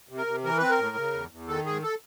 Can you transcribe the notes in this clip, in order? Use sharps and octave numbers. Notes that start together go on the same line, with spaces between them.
C3
A#4
C3
E3 A#4
C4 B4
A#4
A2
C#3
E2
E2
D#3 A4
G#2 G#4
A4